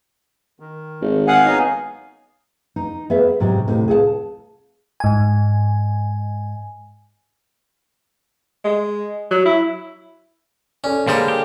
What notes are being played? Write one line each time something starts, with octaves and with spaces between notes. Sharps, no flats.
D#3
G#1
G#4 F5 F#5 G#5
B3 C#4 D#4
D#4
B3 G#4 E5
G#2 C3 F#3 G4
A2 C3 D#4
G#4 A4 F#5 A5
G#2 G#5
G#3
F#3
E4
C#4 A4 C#5 D5
D3 G3 G#3 A#3 G#4 C5
G4